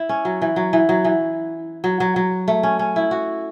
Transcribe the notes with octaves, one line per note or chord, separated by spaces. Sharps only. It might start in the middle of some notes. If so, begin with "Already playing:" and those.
Already playing: E4
C#4
F#3
E3
F#3
E3
F#3
E3
F#3
F#3
F#3
A3
C#4
C#4
E4
F#4